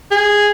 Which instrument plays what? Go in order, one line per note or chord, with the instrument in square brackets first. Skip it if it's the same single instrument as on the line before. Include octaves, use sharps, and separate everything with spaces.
[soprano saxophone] G#4